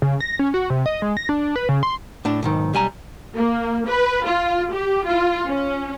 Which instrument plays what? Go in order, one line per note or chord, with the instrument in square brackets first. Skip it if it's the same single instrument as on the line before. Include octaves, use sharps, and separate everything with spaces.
[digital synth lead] C#3
A#6
C#4
F#4
C3
D#5
G#3
A#6
D4
B4
C#3
C6
[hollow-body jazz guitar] A2 D4
B1 G#2 D#3
B1 G3 G#5 A#5
[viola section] A#3
B4
F4
G4
F4
C#4